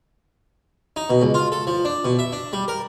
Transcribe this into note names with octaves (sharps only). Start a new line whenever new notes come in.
D#4
B2
C#2
F4
A4
F3
D4
B2
E5
D4
G3
A#4